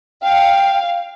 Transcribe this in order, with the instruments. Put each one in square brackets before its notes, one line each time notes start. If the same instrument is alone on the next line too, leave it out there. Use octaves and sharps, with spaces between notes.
[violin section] F5 [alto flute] G5